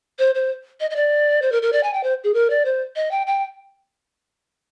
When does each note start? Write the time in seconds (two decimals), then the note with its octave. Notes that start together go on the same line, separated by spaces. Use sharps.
0.19 C5
0.35 C5
0.80 D#5
0.90 D#5
0.96 D5
1.42 C5
1.52 A#4
1.62 A#4
1.72 D5
1.83 G#5
1.93 G5
2.03 C5
2.24 G#4
2.34 A#4
2.50 D5
2.65 C5
2.96 D#5
3.11 G5
3.27 G5